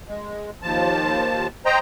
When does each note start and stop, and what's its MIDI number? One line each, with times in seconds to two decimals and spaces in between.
0.08 0.50 56
0.62 1.47 39
0.62 1.47 53
0.62 1.47 81
1.66 1.79 72
1.66 1.79 75
1.66 1.79 79
1.66 1.79 82